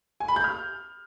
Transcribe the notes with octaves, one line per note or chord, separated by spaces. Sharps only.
G#5
B5
G6
F6